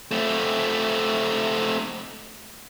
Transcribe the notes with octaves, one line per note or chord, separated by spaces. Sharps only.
A3 C4